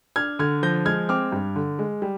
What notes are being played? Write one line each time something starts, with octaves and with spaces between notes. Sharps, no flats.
D4 F6 G#6
D3 F6 G#6
F3 G6 A#6
G#3 F6 G#6
C4 D6 F6
G2
D3
G#3
G3